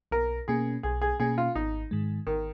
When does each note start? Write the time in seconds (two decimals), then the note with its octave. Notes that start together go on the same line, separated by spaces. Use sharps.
0.11 B1 A#4
0.48 B2 A#3 C#4 G#4
0.83 B1 G#4
1.01 G#4
1.20 B2 A#3 C#4 G#4
1.38 F4
1.55 G#1 D#4
1.91 G#2 D#3 G#3
2.27 G#1 D#3